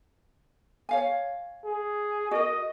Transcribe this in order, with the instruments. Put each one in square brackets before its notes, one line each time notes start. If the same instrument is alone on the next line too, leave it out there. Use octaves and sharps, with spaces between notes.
[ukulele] C#5 F5 G#5
[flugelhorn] G#4
[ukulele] F#4 A#4 [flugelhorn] D#5